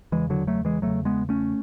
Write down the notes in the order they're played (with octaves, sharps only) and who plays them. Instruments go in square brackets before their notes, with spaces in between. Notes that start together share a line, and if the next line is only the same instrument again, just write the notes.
[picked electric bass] E2 C#3 E3 G#3
D3 F#3
F#3 A3
E3 G#3
E2 C#3 F#3 A3
G#3 B3
A3 C#4